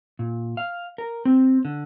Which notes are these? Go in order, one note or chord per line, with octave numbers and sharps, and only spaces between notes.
A#2
F5
A#4
C4
D3